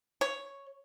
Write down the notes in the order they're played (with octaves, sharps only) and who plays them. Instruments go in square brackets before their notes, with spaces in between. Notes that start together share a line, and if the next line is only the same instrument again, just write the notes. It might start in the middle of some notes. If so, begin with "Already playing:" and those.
[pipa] C#5